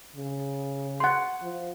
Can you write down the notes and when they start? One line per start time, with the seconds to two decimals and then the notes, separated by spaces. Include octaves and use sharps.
0.16 C#3
1.00 F#5 C6
1.42 F3